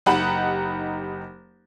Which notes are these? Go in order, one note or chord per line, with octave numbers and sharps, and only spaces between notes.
F#1 D#4 G4 F#5 B5